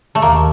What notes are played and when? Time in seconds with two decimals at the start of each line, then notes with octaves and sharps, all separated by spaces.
0.15 A3
0.22 D#2 A#3